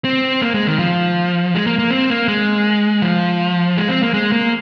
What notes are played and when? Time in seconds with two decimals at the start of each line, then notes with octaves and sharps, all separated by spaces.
0.05 C4
0.42 A#3
0.54 G#3
0.67 D#3
0.79 F3
1.54 G#3
1.67 A#3
1.79 A#3
1.90 C4
2.10 A#3
2.28 G#3
3.02 F3
3.77 G#3
3.89 C4
4.02 A#3
4.14 G#3
4.32 A#3